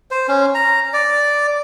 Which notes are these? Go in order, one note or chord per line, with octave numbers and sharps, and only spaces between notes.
C5
C#4
A#5
D5